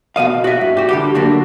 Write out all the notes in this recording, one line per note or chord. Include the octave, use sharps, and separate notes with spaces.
B2 D#3 D#5 F5
F#4 D5 E5
G2
F#4 G4
D3 G3 G4
F#2 D3 A#3 D4 F#4